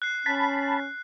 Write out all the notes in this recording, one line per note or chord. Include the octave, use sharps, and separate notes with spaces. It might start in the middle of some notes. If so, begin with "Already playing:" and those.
F#6 C7
C#4 A5 B5